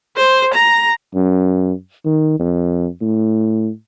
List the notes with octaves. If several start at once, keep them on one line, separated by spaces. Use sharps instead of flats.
C5
A#5
F#2
D#3
F2
A2